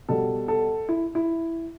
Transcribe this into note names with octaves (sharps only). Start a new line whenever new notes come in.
B2 G3 A4
A4
E4
E4